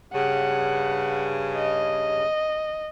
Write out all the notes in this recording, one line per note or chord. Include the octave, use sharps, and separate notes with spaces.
G2 C#3 F#5
D#5